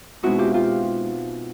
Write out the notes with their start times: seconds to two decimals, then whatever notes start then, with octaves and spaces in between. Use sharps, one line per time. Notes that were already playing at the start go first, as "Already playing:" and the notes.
0.23 B2 G#3 C4 D#4 E4 F#4
0.38 F4 G4
0.54 F4 G4